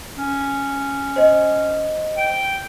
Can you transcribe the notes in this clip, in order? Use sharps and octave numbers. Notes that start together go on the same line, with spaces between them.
C#4
C5 D#5
G5